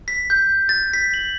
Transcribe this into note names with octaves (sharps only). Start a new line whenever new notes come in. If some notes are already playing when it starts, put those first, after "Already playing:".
B6
G6
A6
B6
F#7